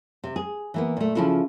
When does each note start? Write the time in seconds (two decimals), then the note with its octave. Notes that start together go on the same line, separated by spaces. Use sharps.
0.24 C3
0.36 G#4
0.74 E3 A#3 B3
0.97 A#2 A3
1.15 C#3 F3 E4 F4 A4